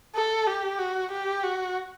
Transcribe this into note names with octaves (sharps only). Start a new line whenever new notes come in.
A4
G4
F#4
G4
F#4